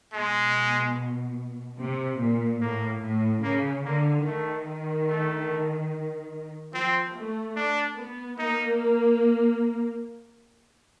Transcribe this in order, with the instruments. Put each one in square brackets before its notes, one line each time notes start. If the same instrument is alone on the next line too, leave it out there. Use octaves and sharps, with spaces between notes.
[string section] B2 [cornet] G#3
[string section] C3
A#2
[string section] A2 [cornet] A#3
[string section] A2
[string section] C#3 [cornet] A#3
[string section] D3 [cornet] A#3
[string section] D#3 [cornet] A3
[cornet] A3
[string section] F3 [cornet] C4
[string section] A3
[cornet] D4
[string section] B3
[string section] A#3 [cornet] D#4